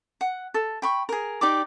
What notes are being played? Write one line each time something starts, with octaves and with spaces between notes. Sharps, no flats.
F#5
A4
G5 B5 C#6
G#4 A#4
D#4 G4 D5 D6